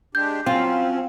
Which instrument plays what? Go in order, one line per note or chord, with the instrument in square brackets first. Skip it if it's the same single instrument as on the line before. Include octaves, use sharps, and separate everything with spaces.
[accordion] G#3 D4 G4 [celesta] G6
[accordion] F3 F#3 C#4 [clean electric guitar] C4 [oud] F4